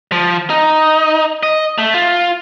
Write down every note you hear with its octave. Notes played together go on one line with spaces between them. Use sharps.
F3
D#4
D#5
A3
F4